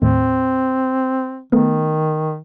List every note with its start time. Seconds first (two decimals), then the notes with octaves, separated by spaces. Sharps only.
0.02 D#2 A2 C4
1.52 D#3 A3 B3